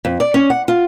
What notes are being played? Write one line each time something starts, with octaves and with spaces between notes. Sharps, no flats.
F2
D5
C#4
F#5
F4